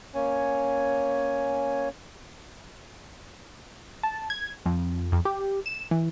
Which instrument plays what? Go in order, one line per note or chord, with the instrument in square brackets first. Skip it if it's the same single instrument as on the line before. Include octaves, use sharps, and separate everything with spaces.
[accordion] A#3 C#4 C#5 G#5
[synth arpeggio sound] A5
G#6
F2
F2
G4
E7
E3